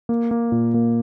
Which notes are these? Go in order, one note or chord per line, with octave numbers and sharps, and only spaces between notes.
A#3
A#3
A#2
A#3